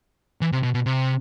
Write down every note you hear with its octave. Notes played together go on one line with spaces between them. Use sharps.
E3
C3
B2
B2
C3